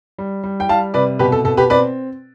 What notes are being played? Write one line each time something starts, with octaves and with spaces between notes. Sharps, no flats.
G3
G3
G5
G3 F5 A5
C3 B4 D5
B2 G4 B4
A4
B2 A4
G4 B4
C4 B4 D5